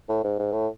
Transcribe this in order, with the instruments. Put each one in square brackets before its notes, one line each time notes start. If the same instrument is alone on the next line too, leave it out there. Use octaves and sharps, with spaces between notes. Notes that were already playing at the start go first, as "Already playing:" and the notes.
[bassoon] A2
G#2
G#2
A2